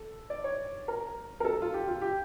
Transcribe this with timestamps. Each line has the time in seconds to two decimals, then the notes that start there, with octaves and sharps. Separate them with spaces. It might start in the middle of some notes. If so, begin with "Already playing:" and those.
Already playing: A4
0.30 D5
0.44 C#5
0.88 A#4
1.40 A#4
1.45 A4
1.62 F4
1.74 G4
1.88 F4
2.01 G4